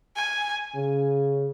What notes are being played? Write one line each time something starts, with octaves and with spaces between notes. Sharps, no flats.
G#5
C#3